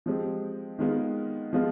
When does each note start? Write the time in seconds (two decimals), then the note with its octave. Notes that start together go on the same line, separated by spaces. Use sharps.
0.06 F3 G#3 C4 G4
0.79 D#3 G#3 B3 F4
1.53 F3 G#3 B3 F4